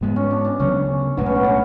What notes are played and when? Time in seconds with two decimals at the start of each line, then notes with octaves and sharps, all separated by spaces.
0.01 G#2 G#3 B3
0.16 C#4
0.31 D4
0.45 D4
0.59 D2 C#3 F#3 B3 C#4
1.17 B1 A2 G#3 B3 D4
1.26 C#4
1.35 B3
1.44 C#4